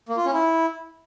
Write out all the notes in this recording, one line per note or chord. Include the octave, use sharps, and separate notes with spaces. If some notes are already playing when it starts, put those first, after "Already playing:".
A#3
F4
C#4
E4